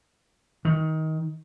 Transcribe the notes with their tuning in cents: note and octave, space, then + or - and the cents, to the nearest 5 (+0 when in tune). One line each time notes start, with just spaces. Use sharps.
D#3 +20